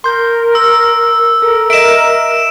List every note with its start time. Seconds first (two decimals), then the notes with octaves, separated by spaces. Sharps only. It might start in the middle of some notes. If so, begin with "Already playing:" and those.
0.04 A#4 C6 G6
0.55 E6
1.42 A4 A#4
1.70 D#5 E5 D7 E7